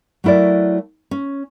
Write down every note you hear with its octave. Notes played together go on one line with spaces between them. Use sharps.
F#3 A3 E4 A#4 D5
C#4